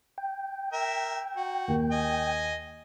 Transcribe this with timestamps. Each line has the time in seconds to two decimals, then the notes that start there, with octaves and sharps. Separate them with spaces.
0.18 G5
0.73 A#4 E5
1.37 F#4
1.68 D#2
1.92 D#5 G#5